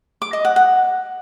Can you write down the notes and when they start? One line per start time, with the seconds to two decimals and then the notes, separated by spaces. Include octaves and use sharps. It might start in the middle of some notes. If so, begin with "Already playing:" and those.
0.22 D6
0.33 D#5
0.45 F#5
0.56 F#5